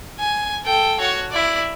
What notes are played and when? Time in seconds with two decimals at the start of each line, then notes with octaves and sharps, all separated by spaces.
0.19 G#5
0.65 A4 G5
1.00 F#4 C#5
1.32 E4 D5